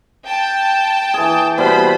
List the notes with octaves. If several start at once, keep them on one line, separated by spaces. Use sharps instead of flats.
G5 A5
E3 G#4
B2 G3 C5 B5